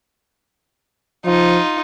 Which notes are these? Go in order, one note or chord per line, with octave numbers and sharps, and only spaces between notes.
F3 D#4 F4